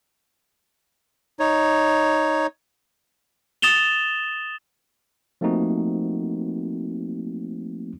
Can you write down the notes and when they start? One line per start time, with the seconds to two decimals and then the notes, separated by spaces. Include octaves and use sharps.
1.39 D#4 C#5
3.62 D#6 A6 E7 F7 G7
5.41 F3 A3 A#3 C4 D#4 F#4